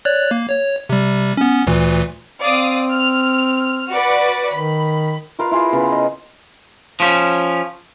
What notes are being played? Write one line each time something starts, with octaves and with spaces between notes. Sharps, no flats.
C#5 D5 F#6
A#3
C#5
C3 G3
B3 C#4
D2 A#2 E3
C4 D5 F5 D#6
F6
F#4 B4 D5
D#3 B5
F4 A#4 B4 F5
E4 F4 G#4
C#3 B3 A#4
D#5
F3 C#4